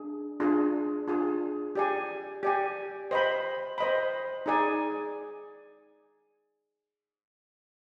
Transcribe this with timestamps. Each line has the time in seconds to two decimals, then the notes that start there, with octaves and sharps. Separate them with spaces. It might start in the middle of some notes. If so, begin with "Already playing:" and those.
Already playing: D4 G#4
0.40 D4 F4 G#4
1.08 D4 F4 G#4
1.75 G4 D5 G#5
2.43 G4 D5 G#5
3.11 C5 D#5 B5
3.78 C5 D#5 B5
4.46 D#4 G#4 D5 G#5